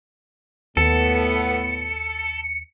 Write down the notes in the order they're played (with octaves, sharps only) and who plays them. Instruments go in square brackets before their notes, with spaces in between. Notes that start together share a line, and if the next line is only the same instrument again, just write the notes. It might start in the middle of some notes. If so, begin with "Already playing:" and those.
[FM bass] D#2 [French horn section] A2 A3 B3 [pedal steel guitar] A4 [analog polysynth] C#7